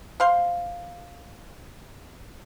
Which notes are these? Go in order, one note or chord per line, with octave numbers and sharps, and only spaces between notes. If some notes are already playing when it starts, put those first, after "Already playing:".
C5 F5 C6